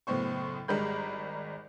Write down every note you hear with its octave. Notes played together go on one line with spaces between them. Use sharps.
F#1 A2 B3 C5 C#6
G#1 G3 G#3 A#4 B5 G6